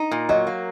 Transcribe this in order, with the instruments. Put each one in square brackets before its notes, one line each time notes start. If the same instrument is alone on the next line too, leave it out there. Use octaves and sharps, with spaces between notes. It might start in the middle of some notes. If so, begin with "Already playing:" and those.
Already playing: [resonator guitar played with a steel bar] D#4
A#2
[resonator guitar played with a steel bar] F#3 [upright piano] D#5
[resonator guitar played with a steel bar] A#3